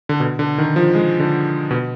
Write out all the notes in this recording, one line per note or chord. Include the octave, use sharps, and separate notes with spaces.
D3
B2
D3
D#3
F3
G#3
D3
B2